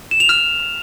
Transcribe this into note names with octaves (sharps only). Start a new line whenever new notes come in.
E7
F7
F6